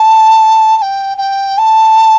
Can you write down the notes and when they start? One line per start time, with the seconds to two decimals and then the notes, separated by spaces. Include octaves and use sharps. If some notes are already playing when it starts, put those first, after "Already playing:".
Already playing: A5
0.77 A5
0.81 G5
1.17 G5
1.58 A5